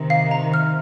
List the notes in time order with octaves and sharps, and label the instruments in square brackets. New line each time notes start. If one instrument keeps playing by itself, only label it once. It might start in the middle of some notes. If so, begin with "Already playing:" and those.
Already playing: [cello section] C3 D#3
[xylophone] F5
A#5
F6